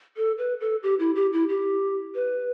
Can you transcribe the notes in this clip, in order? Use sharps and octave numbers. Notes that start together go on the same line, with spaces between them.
A4
B4
A4
G4
E4
G4
E4
G4
B4